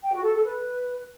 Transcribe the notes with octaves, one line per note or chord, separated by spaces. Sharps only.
G5
F#4
A4
A4
B4